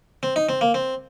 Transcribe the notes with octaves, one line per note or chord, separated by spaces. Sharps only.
C4
D#4
C4
A#3
C4